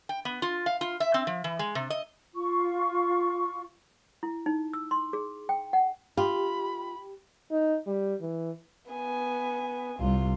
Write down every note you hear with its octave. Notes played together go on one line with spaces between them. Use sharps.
G5
B3
F4
F5
F4
E5
C4
F3
E3
G#3
C3
D#5
F4 C#6
E4
D#4
E6
C6
G#4
G5
F#5
F4 G4 B5
D#4
G3
E3
B3 G#5
C2 G3 F4